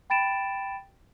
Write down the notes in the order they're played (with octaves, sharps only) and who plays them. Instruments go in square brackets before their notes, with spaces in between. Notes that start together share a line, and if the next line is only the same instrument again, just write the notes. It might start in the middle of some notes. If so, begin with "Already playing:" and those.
[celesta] G5 B5 A6 D7 E7